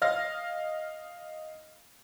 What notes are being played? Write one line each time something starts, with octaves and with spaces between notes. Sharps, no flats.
D#5 F5 F6 A#6